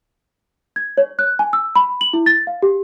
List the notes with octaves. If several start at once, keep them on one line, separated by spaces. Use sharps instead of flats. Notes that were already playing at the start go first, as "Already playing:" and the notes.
G#6
C#5
F#6
G#5
E6
B5
F#7
E4
A6
F5
G4